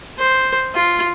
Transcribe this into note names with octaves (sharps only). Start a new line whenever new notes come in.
C5
F4